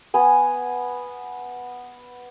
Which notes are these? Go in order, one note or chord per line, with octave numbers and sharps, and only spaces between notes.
B3 G#5